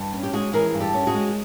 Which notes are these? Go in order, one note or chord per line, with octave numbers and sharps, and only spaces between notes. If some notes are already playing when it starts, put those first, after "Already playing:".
Already playing: G2
C#4
G4
G#3 F#4 G#4
E3 G#4 A#4
G2
G4 A4
C#4
F#4 G#4
G#3